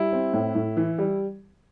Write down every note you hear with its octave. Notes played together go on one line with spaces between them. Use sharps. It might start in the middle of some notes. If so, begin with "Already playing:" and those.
Already playing: G3 E4
C4
A2
A2
E3
G3